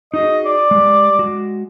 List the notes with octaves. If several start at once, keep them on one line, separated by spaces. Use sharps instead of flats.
D#4 F#4 G#4 D#5
D5
G#3 G4
G#3 F#4